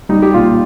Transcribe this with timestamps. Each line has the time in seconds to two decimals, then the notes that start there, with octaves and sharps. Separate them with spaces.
0.09 G3 D#4
0.22 G4
0.34 A#2 F4